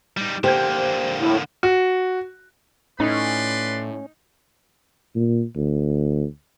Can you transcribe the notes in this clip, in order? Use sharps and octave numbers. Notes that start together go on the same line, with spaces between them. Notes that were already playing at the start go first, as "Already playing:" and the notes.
G3 D#4
D3 A#3 G4 C5 G6
A2
F#4
A2 C#4 D#4 B4 D5 C6
A#2
D2